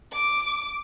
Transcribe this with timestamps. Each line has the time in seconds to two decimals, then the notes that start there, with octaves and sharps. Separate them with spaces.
0.12 D6